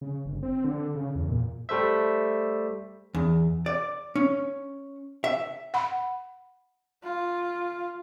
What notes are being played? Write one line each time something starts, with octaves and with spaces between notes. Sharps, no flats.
C#3
G1
C4
D3
C#3
E2
A#2
G3 A3 C5 E5
E2
D5
C#4
E5
F#5 B5
F4